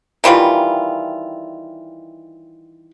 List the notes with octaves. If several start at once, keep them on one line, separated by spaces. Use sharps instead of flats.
D#3 E3 G3 F4